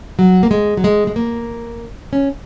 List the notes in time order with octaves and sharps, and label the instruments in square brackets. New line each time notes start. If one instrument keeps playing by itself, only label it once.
[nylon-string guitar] F#3
A#3
G#3
F#3
G#3
G#3
A#3
C#4